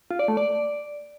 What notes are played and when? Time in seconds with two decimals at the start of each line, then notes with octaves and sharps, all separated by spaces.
0.11 F4
0.19 D5
0.28 A3
0.37 D5